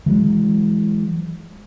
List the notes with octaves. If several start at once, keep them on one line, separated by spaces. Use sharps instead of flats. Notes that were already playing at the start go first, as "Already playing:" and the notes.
E3 F#3 G#3